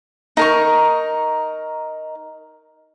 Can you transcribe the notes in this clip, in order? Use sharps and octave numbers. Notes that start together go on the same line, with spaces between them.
D#4 A#4 C#6